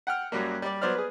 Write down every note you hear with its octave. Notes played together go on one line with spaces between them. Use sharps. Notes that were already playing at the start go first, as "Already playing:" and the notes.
F#5 G5 F6
F#2 F#3 G3 A#3
G3 D5
F#3 B3 C5 D5 F6
G#4 B4